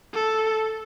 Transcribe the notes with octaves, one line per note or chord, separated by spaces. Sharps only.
A4